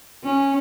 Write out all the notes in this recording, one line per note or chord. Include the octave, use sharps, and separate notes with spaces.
C#4